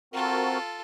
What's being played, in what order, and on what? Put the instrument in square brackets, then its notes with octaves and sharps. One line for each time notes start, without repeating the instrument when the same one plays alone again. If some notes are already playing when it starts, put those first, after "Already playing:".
[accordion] C4 F#4 A#4 [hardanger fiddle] F4 A4